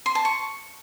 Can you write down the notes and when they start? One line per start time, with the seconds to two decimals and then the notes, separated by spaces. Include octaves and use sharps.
0.06 C6
0.15 A5
0.25 C#6